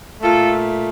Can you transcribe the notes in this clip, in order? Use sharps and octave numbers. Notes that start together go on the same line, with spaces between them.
A#2 A3 F4 A4